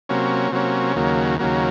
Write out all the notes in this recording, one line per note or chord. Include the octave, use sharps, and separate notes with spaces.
C3 F#3 A#3 C#4
C3 F#3 A#3 C#4
D#2 C#3 F#3 A#3
D#2 C#3 F#3 A#3